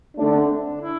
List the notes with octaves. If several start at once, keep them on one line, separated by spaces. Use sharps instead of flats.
D3 A3 C4 D4
D4
E4